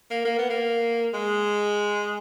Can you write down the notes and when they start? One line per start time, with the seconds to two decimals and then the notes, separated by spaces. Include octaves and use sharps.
0.10 A#3
0.25 A#3
0.38 B3
0.50 A#3
1.14 G#3